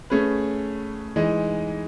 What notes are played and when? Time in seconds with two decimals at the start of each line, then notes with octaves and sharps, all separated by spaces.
0.10 A3 C#4 G#4 B4
1.16 E3 G#3 D#4